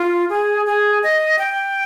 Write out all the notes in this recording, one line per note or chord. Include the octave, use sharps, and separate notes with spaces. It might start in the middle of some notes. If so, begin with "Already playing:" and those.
Already playing: F4
G#4
G#4
D#5
G5